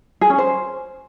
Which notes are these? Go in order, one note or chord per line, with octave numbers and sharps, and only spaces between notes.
G#4
C#4
C5